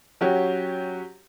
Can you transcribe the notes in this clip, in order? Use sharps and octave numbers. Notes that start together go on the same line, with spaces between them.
F#3 C#4 F#4 G4